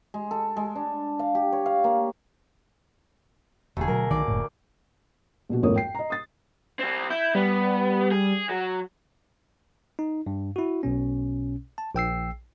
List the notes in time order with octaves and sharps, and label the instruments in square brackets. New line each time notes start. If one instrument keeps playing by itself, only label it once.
[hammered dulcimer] G#3
A4
G#3
D4
F5
G4
C#5
F5
A#3
[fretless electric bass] E1 [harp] D2 G#4
[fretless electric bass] B2 F#3 [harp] A#4
[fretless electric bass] B1 D#3 [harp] D5
[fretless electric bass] F#1 A2
[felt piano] A#1 B2 F#4
G#1 F2 A2 A#3 C#5 D#6
G5 C7
D#5 A#5
D#6 A6
[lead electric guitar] G3 C4
[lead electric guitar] E4 [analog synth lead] G6
[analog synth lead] G3 [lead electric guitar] B3
[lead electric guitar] G#4
F#3
[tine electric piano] D#4
G2
E4 F#4
B1 B2 C#4
A5
A#1 G5 E6 C7